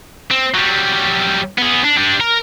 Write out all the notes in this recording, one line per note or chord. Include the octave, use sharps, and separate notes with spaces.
C4
F#3 G3
B3 G#4
D4
G3 D4
A#4